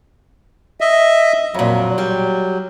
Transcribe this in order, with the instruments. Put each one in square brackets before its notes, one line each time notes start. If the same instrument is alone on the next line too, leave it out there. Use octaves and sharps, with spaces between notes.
[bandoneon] D#5 E5
[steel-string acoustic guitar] F2 A#2 [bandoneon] F#3
[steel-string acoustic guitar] G3